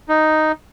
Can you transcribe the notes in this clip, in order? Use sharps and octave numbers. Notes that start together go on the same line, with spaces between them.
D#4